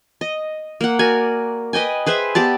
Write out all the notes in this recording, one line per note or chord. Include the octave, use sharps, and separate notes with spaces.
D#5
A#3 F#5
F#4 A#4 D5 G#5
B4 D#5 G5 G#5
G#4 B4 C5 E5
B3 G4 D5 A5